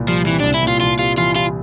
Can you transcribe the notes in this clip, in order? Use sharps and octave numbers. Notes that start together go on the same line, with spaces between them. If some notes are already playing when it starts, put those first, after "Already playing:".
Already playing: C2 A#2
F3 G3
E3 C4
C2 D4
E4
A#2 F4
C2 F4
C3 F4
E3 F4
G3 F4